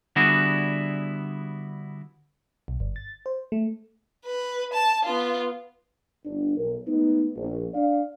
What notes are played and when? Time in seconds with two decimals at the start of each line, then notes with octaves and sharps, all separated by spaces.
0.16 D3 G3 B3 E4 F#4 G#4
2.68 B1
2.80 G1
2.96 A6
3.26 C5
3.52 A3
4.26 B4
4.73 A5
5.05 B3 F4
6.25 G1 D4
6.57 B1 A#4
6.87 G#3 A3 B3 D#4
7.35 A#1
7.74 D4 D5 F5